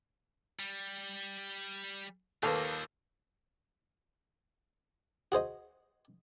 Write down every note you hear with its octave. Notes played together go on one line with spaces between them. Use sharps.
G3
D#2 A#3 F4 A4 B4 D#5
F#4 G#4 C5 D#5